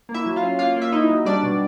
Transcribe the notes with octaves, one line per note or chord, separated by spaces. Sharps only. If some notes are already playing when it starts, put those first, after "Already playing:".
A#3
E4 E5
F#3
F4 F5
C#4
A#3 F4 F5
A#3
E5
D#4 E4 D#5
F#3
G3 D4 D5
B2